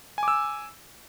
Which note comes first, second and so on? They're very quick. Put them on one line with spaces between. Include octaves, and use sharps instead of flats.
G#5 D6 E6